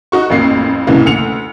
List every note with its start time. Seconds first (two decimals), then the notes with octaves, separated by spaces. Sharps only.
0.12 D#4 F#4 C#6
0.30 A1 F2 A#3 C7
0.87 C2 G#2 C#3 E3 A#3
1.05 D2 C#7 F7